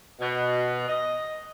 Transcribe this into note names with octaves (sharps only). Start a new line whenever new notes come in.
B2
D#5